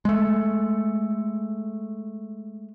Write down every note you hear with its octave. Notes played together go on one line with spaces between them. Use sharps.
G#3 A3